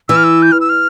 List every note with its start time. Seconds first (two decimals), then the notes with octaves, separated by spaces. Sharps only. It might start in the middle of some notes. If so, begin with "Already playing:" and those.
0.09 E3 E6
0.17 F6
0.24 E6
0.42 G6
0.52 F6
0.61 E6
0.69 F6